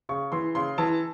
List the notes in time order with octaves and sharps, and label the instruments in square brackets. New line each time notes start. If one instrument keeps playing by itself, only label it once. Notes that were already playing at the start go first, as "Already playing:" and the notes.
[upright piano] C#3 C#6
E3 C6
C#3 C6
E3 A5